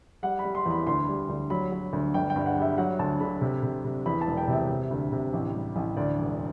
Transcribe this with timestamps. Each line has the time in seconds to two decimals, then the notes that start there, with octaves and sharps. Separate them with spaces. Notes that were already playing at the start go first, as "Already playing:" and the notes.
0.23 G3 F#5
0.39 B5
0.44 G3
0.55 C6
0.66 E2
0.71 B5
0.87 D2 C6
1.09 G3
1.29 D2
1.50 F#3 B5
1.72 F#3
1.93 D2
2.14 G1 G5
2.30 G5
2.36 G2
2.46 F#5
2.56 G3
2.62 E5
2.78 F#3 F#5
2.99 D2 A5
3.20 D3 B5
3.41 C3
3.63 C3
3.84 C3
4.06 E2 B5
4.21 A5
4.27 E1
4.37 G5
4.48 C3
4.53 E5
4.69 C3
4.91 D2
5.12 C3
5.33 A1
5.54 G3
5.76 A1
5.97 D2 D5
6.18 E1